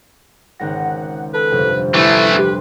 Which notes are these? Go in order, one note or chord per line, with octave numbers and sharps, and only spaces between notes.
G#1 C#2 F#5 A#6
A4 B4
G1 F2 C3
D2 E3 A3 E4 B4
G4 C6 D6